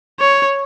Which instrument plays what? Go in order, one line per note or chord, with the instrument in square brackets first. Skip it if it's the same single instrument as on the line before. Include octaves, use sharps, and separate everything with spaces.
[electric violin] C#5